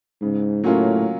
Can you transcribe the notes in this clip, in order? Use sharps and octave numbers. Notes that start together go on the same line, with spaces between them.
G#2 C#3
A2 F#3 A#3 C#4 F4